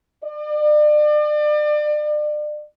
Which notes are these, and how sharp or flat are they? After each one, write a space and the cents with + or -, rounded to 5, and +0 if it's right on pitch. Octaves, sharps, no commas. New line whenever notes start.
D5 +35